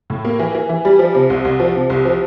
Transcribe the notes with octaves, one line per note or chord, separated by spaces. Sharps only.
A2
A#3
E3
E3
E3
G3
F3
C3
C2
C2
F3
C3
C2
F3